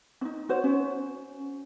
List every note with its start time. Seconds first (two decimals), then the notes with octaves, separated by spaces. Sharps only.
0.21 C#4 D#4
0.49 F#4 C5 C#5
0.64 C#4